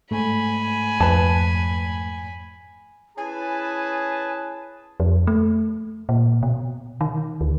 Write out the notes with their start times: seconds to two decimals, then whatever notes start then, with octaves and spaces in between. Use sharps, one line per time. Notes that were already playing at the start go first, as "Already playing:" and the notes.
0.11 G#2 A3 G#5 B5
1.00 F2 B4 A5
3.18 C#4 E4 G#4 B4 G#5 A5
5.00 F2
5.27 A3
6.09 A#2
6.43 B2
7.01 D#3
7.41 D2